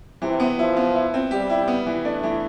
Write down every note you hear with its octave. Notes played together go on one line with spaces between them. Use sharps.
C3 E3
B3
F3 E4
B3
E4
C4
G3 G4
E4
B3
E3
A3 D4
E3